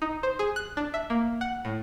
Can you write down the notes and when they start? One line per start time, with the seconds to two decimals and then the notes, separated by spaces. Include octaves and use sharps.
0.02 D#4
0.23 C5
0.39 G#4
0.56 F#6
0.77 D4
0.94 E5
1.10 A#3
1.41 F#5
1.65 A2